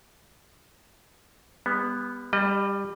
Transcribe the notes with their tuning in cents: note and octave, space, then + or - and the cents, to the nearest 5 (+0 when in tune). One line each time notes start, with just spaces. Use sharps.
G3 +35 B3 -5
G3 +15 D#5 -35